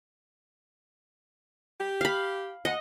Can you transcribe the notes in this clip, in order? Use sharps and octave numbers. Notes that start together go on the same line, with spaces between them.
G4
F5 B5
D2 D#5 F#5